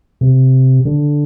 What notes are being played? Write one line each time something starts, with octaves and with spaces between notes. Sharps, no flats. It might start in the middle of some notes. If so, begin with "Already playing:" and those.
C3
D3